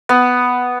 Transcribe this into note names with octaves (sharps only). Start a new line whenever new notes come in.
B3